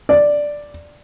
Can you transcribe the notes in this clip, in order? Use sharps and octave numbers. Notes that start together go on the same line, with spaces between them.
D5